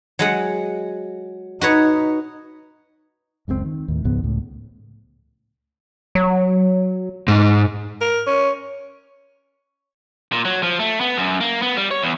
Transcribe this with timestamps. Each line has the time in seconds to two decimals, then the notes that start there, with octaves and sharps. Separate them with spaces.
0.19 F#3 G#3 F#5
1.61 D#4 F#4 B4 C#5
3.48 F#1 C#2 A2 C4
3.65 D#3
3.88 D#2 A2
4.05 C#2 G#2 F3 B3
4.23 C#2 A2
6.15 F#3
7.28 G#2
8.01 A#4
8.27 C#4
10.32 A#2
10.45 F#3
10.63 F3
10.79 A3
11.01 B3
11.18 F#2
11.41 A#3
11.62 B3
11.77 G3
11.91 C#5
12.02 E2